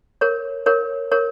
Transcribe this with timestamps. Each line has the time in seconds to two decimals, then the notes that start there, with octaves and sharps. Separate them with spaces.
0.21 A#4 C#5
0.66 A#4 C#5
1.12 A#4 C#5